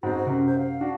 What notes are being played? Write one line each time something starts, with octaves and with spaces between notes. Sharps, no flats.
G#2 C4 F#4
F#2 C3
C5
F5
D4 F#4